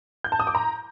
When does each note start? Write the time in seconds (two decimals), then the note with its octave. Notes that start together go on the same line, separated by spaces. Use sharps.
0.24 G6
0.32 A5
0.40 D#6
0.47 D6
0.55 A#5